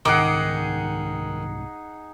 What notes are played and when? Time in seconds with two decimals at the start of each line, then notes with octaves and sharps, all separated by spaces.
0.05 C2 G#2 D#3 D#4 G#4 F#5 D6